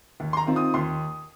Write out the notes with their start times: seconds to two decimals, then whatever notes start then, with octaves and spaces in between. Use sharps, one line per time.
0.20 D#2
0.33 C6
0.37 A#5
0.47 D#3 C4 F4
0.56 D#6
0.74 D#2 C6